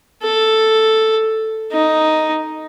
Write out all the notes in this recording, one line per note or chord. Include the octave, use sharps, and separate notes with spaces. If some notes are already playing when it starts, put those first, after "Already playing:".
A4
D#4